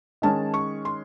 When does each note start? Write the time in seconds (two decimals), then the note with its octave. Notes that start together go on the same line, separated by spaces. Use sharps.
0.22 D#3 G#3 C#4 A5
0.54 C#6
0.85 C6